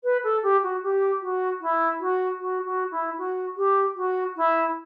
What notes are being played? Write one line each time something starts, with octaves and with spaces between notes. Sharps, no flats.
B4
A4
G4
F#4
G4
F#4
E4
F#4
F#4
F#4
E4
F#4
G4
F#4
E4